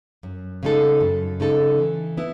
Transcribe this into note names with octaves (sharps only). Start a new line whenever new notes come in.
F#2
C#3 G#3 D#4 A4
F#2
C#3 G#3 D#4 A4
E3
B3 E4